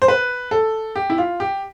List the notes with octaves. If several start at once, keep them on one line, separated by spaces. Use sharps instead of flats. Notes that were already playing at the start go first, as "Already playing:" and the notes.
C5
B4
A4
G4
E4
F4
G4